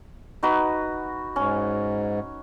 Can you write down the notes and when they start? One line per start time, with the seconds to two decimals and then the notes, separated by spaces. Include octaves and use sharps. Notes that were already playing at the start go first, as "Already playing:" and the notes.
0.43 D#4 F#4 B4
1.36 G#2 C#4